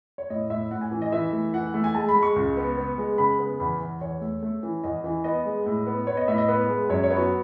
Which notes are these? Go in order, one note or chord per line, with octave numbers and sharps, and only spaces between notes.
C#5
A2 D#5
A2 E5
A2 F#5
G#5
E3
D#5
E3 E5
A3
E3 F#5
A3
G#5
G#3 A5
B5
G#3
C#6
C#2
B3
B3
G#3
C#3 B5
B3
E2 B5
E2
E2 C#5
A3
A3
E3
E2 D#5
E3
B3 D#5
G#3
A2
B3
B3 C#5
D#5
A2 E5
D#5
B3 B4
G#3
F#2 C#5
C#5
B3
F#4